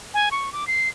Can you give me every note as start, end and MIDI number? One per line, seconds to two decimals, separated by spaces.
0.14 0.29 80
0.31 0.52 85
0.53 0.67 86
0.67 0.89 96